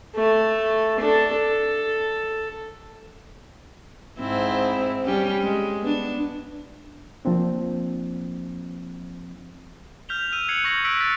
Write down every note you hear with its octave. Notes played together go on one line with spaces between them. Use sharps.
A3
D4 A4
A4
G#2 C4 E4
G3 C#4 G4
G#3
B3 D4
F3 A#3 C4 D4
F6 G6 B6 F7 G7
E6 F6 D#7 F7
F#6 G#6 C7 C#7 F#7
C#6 G#6 A#6 D#7 F#7
E6 F#6 B6 D7 F#7
F#6 A6 B6